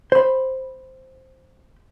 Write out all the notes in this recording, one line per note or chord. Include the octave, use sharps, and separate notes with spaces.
C5 B5